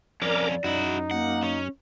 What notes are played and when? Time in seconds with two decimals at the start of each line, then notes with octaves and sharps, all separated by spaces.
0.22 F2 C#4 A#4 D5 A#5 D6
0.64 F#2 D#4 E4 F#4
1.11 A#3 F#5
1.43 C#4